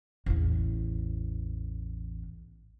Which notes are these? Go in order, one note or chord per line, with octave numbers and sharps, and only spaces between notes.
A1 E2